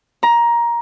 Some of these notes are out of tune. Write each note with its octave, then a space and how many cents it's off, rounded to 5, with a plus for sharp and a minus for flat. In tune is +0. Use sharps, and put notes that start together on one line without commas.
A#5 +15